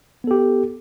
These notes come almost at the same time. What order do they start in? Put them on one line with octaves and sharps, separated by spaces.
B3 A4 G4